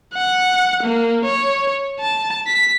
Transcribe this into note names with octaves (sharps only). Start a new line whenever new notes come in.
F#5
A#3
C#5
A5
B6